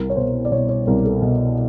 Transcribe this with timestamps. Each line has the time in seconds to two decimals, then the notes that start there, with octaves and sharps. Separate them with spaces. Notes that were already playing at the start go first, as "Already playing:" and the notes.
Already playing: C2 A#4
0.10 C#5
0.16 B2 C5
0.45 D5
0.51 B2 C#5
0.69 C#5
0.87 C2 A#4
1.05 A4
1.22 B2